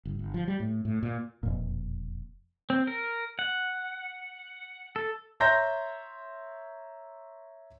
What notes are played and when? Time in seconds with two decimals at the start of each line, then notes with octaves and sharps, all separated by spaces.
0.05 G1
0.19 G1
0.34 F3
0.48 G3
0.60 A2
0.85 A2
1.03 A#2
1.43 E1 F2 A#2
2.70 C4
2.87 A#4
3.39 F#5
4.96 A4
5.40 C#5 E5 A#5 C6 G6 A#6